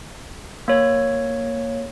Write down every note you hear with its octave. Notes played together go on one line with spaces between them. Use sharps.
A#3 C#5